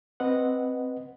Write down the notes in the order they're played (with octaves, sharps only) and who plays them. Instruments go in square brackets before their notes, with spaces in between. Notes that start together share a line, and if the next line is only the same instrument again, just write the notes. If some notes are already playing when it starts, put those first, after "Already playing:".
[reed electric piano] C4 B4 D#5 F#5